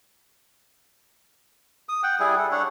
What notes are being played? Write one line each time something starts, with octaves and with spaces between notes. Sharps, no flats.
D#6
F#5 G5
G3 E4 G#4
A4
D4 C#5 F#5